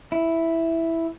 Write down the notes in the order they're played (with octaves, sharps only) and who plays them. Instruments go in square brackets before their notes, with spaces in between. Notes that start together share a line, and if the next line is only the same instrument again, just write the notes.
[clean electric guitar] E4